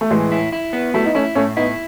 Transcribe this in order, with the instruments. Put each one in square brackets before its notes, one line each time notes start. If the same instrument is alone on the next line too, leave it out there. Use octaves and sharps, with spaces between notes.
[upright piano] A3
[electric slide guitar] A2 [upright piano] E3 G#3
[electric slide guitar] E4
E4
B3
[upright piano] F#3 A3 [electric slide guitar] E4
[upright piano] D#4
[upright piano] A3 C#4 [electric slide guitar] E4
[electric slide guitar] A2 [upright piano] A3 C#4
[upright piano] B3 D#4 [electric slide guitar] E4